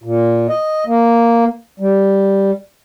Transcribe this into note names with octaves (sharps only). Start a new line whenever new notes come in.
A#2
D#5
A#3
G3